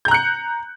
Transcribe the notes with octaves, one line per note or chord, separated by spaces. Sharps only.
A#5 F#6 G6 C#7